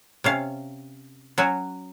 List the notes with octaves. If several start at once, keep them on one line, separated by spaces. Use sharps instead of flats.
C3 C#4 F5
F#3 C#4 F#4